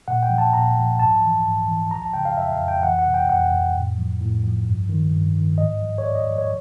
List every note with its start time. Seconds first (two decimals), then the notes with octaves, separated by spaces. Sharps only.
0.08 A#2 F#5
0.23 G5
0.30 F3
0.38 A5
0.53 A#2 A#5
0.76 F3
0.99 G#2 A5
1.22 E3
1.45 G#2
1.68 E3
1.91 F3 A#5
2.02 A5
2.13 C#3 G5
2.25 F5
2.37 F2 E5
2.52 F5
2.60 F2
2.68 G5
2.83 E3 F#5
2.99 F#5
3.06 C3
3.14 G5
3.29 F2 F#5
3.52 F2
3.75 A2
3.98 F3
4.20 A2
4.44 F3
4.67 G2
4.89 D#3
5.13 G2
5.36 D#3
5.58 G#2 D#5
5.81 F3
5.98 C#5
6.04 G#2 D5
6.15 D#5
6.28 F3
6.38 C#5